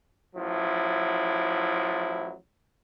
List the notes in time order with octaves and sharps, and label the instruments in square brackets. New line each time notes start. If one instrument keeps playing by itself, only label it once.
[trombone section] A1 F3 F#3 E4